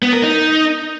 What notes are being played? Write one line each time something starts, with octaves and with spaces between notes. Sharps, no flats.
B3
A#4
D#4